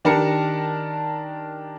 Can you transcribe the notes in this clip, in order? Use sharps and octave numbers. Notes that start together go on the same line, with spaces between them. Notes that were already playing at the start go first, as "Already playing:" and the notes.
D#3 D4 G4 A#4 A5 C#7